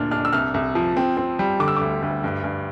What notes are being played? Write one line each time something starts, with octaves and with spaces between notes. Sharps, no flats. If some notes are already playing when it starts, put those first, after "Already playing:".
Already playing: D2 A#2 D4 F6
D4 F6
E6
C2 F6
C2
F3
C4
C4
G3
D3 D6
E6
D2 D6
D2
G2
G2